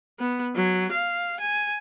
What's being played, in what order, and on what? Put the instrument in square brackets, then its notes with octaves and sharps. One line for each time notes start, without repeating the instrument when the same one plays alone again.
[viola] B3
F#3
F5
G#5